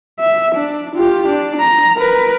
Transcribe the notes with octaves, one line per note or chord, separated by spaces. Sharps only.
E5
D4
F4 G4
D4
A#5
A#4 B4